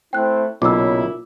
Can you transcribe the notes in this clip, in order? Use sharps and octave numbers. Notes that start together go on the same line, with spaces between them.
A3 C4 E4 G5 F#6
B1 A#2 C#3 F#3 E4 D6 E6